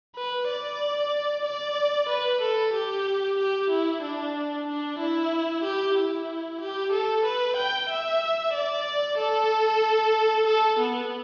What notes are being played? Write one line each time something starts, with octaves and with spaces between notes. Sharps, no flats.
B4
D5
D5
B4
A4
G4
G4
E4
D4
D4
E4
G4
E4
G4
A4
B4
G5
E5
D5
A4
A4
B3